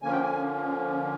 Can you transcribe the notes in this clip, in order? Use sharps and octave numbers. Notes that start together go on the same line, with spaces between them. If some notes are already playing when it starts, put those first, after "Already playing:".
D3 F3 A#3 C#4 G#5
G5
G#5